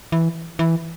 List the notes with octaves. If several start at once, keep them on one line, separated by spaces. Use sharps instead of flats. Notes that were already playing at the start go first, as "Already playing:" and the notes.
E3
E3